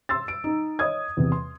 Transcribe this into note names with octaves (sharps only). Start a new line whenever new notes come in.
C6 E6 A6
D7
D#4
C#5 D#5 D#6 G#6
E2 C3
C6